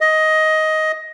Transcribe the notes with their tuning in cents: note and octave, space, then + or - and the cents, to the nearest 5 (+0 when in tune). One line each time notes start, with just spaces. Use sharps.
D#5 +15